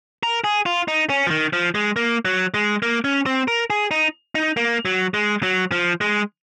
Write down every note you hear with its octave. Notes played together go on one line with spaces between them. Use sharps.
A#4
G#4
F4
D#4
C#4
F3
D#3
F3
G#3
A#3
F#3
G#3
A#3
C#4
C4
A#4
G#4
D#4
D#4
A#3
F#3
G#3
F#3
F3
G#3